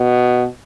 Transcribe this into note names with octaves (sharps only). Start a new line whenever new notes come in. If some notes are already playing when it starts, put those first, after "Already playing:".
Already playing: B2